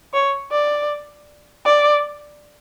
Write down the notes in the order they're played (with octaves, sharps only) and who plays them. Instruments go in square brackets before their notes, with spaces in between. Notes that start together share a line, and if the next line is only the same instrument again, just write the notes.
[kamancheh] C#5
D5
D5